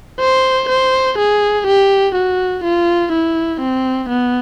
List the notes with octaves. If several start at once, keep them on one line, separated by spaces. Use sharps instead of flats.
C5
C5
G#4
G4
F#4
F4
E4
C4
B3